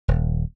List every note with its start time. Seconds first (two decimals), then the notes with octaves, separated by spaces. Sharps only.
0.08 D#1